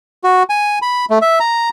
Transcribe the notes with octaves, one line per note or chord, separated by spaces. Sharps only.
F#4
G#5
B5
A3
E5
A#5